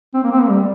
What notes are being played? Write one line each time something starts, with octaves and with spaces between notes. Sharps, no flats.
C4
A#3
C4
A#3
G3